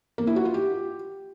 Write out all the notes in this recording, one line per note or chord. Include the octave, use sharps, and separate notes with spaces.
A#3
E4
F#4
F4
G4